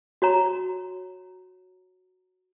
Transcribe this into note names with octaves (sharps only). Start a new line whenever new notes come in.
F#4 C#5 A#5